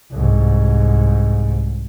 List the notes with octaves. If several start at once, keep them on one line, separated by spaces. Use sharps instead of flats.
C2 G#2